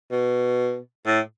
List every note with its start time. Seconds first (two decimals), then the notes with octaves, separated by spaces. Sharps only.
0.11 B2
1.06 A2